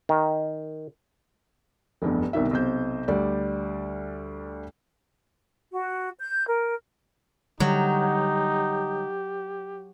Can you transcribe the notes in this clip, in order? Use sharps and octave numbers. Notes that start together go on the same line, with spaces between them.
D#3
F1 E2 G2
C2 B2 D#3 E5
B1 C3 C5 G6
D2 G3 D5
F#4
G6
A#4
D3 F#3 G3 D#4 G4